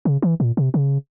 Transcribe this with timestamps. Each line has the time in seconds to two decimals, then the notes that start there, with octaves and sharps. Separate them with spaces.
0.05 C#3
0.22 E3
0.40 A#2
0.57 C3
0.74 C#3